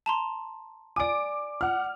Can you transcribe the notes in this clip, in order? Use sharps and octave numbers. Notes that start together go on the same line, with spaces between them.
A5 A#5 C6
D5 G#5 D6 D7
F#5 F6